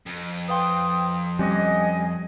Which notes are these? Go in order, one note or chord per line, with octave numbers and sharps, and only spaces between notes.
F2
B4 F5 G5 C6 D#6
G3 C4 C#4 D#5 G#5